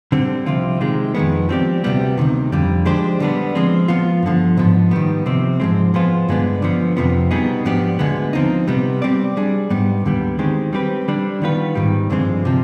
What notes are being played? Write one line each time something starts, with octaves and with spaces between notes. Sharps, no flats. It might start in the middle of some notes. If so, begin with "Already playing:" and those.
D3 G3 C4
C2 C3 F3 C4 F4
C3 D#3 G#3
F2 D#3 G#3 B3
F3 C4 G4 D5
D2 C3 G3 B3
D2 C3 D#3
F2 D3 G3
F3 G#3 D4 G4 C5
D3 G3 B3 D4
F3 G#3 C4
F3 B3 F4
G2 D3 F3
G#2 F3 B3
D#3 G3 B3
C3 F3 C4
G#2 F3 G#3 C4
F3 G#3 B3 F4 C5
G2 D3 G#3 B3 D4
D3 F3 B3
F2 C3 F3 B3
B2 G3 B3 D#4 G#4
G#2 F3 B3 D4 G4
D2 D3 G#3 B3
F3 C4 D#4
C3 G3 B3
G3 C4 G4 D5
G3 D4 G#4
G#2 G3 B3
D#2 D3 G3 B3
D#3 G#3 C4 G4
G3 C4 G4 B4
D3 G3 D4
D#3 G3 B3 F4 B4
G#2 D#3 G3
G2 D3 F3 G#3 C4
C3 F3